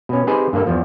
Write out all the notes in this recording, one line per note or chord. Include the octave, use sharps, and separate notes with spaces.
B2 C#4
C4 D#4 G4 G#4 B4 C5
G2 A#3 A4
E2 F3